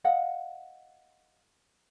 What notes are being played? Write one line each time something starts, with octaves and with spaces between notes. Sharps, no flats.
D#5 F5 F#5